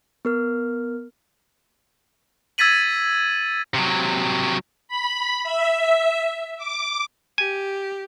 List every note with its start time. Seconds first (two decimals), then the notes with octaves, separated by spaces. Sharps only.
0.25 B3 A#4 F6
2.58 E6 G#6 A6 B6 D#7 F#7
3.75 C3 F#3
4.88 B5
5.43 E5
6.58 D6
7.38 G4 G#5